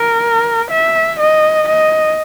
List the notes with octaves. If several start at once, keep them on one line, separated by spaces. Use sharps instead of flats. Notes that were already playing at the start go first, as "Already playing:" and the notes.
Already playing: A#4
E5
D#5
D#5